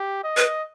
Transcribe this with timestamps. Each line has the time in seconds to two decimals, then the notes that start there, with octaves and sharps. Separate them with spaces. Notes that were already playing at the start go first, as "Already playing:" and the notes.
Already playing: G4
0.24 D#5
0.37 B4